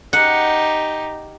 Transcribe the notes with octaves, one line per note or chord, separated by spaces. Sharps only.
D#4 G4 F#5